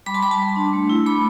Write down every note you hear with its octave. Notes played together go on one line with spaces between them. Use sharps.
G3 B5 D6
A5 C6
G3 B5 D6
A5 C6
G3
D4
A3
E4
A3 B5 D6